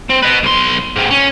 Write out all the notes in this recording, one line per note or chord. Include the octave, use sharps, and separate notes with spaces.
C4
B4 D#5
B1 C6
G#2 C3
C#4